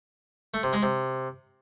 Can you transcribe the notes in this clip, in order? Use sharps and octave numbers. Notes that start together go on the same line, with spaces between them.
A3
C3
G#3
C3